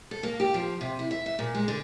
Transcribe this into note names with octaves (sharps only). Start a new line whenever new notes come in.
A4
A#3
G4
F3
C3
E4
E5
E5
A#2
G#3
D3